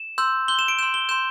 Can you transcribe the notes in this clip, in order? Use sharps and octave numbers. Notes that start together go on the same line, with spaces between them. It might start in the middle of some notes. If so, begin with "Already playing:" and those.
Already playing: E7
C6 E6 G6
C6 G6 G7
E7
D7
C6 G6 E7
G7
C6 G6 E7